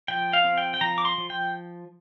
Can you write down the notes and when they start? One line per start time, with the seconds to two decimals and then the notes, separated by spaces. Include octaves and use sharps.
0.08 F3 G5
0.33 F5
0.44 C4
0.58 G5
0.74 G5
0.81 F3 A#5
0.98 D6
1.05 C6
1.18 F3
1.30 G5